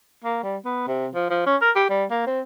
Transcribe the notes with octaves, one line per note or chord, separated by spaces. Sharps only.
A#3
G3
B3
C3
F3
F3
C#4
A#4
G4
G3
A#3
C4